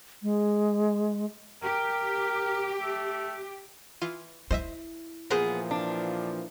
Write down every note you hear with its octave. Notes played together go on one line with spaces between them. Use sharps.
G#3
G4 A#4
A3
E3 F4 D#7
E4 C5 D#5 E5
A#2 E3 F3 B3 G#4 A#4 C5 F#6
D4